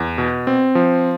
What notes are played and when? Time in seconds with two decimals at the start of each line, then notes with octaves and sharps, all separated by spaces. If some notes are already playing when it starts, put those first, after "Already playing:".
Already playing: E2
0.18 B2
0.47 C4
0.75 F3